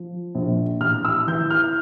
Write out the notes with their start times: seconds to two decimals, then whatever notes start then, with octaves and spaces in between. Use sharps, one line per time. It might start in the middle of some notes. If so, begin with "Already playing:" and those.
Already playing: F3
0.35 A#1
0.80 A1 F6
1.05 E6
1.27 E3 G6
1.51 F6